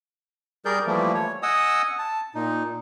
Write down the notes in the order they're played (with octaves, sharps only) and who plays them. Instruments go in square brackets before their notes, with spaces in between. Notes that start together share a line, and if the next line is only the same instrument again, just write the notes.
[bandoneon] G3 G#4 A#4 D5 G6
E3 F3 G3 A3 A#3
C#5
D#5 F#5 G#5 D#6 E6
A5
A#2 D#4